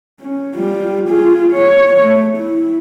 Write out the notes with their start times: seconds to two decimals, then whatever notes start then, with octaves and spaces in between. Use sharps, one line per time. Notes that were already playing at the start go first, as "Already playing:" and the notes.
0.20 C#4
0.55 G3 F4
1.08 F4 G#4
1.52 C#5
2.01 A3
2.37 E4